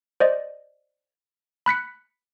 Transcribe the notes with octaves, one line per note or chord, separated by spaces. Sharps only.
C5 D5 D#5
B5 F#6 B6 C#7